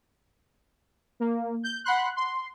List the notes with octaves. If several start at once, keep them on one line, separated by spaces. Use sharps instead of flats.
A#3
G6
F#5 B5 C6 F#6
C6